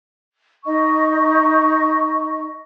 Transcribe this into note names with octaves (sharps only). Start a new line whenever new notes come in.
D#4 D#5 C#6